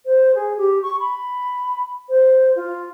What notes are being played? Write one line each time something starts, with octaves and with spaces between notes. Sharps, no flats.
C5
G#4
G4
C#6
B5
C5
F4